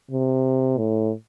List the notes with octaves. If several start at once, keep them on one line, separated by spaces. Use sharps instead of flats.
C3
A2